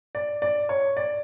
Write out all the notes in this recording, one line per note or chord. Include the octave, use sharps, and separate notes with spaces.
D5
D5
C#5
D5